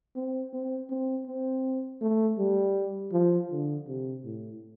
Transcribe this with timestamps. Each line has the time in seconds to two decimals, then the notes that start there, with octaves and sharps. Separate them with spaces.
0.16 C4
0.53 C4
0.90 C4
1.27 C4
2.01 A3
2.38 G3
3.12 F3
3.51 D3
3.88 C3
4.24 A2